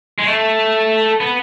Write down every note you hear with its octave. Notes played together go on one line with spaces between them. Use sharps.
G#3
A3
B3